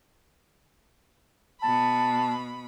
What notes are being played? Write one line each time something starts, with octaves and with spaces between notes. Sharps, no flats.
B2 A5 B5